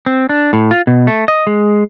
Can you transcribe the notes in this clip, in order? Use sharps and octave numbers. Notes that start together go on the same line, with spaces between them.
C4
D4
A2
F4
B2
A3
D#5
G#3